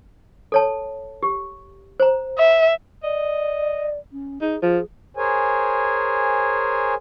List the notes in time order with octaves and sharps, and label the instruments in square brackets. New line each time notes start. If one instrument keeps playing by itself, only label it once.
[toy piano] A4 C#5 A5
G4
C5 A#5
[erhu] E5
[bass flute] D5 [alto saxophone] D#5
[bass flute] C#4
[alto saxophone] D#4 [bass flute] G#4
[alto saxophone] F3 [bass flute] G#4
[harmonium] G#4 A#4 C5 C#5 G#5